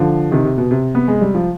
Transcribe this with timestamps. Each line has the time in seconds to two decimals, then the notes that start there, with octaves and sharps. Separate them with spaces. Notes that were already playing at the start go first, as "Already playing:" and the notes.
Already playing: D3 F3
0.31 C3 D#3
0.45 C3
0.58 B2
0.71 C3
0.95 B3
1.08 G#3
1.21 G3
1.35 F3